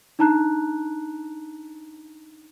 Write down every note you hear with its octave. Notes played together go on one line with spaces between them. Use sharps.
D4 D#4 A5 A#5 F#6